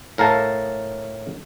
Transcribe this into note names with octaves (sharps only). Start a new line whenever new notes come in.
A2 A#4 F5 A5